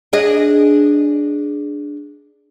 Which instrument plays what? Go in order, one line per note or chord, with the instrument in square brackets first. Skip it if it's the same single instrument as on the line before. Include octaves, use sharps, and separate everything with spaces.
[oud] D4 G#4 D#5